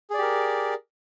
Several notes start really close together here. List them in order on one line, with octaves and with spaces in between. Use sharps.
G#4 D5 G4 A#4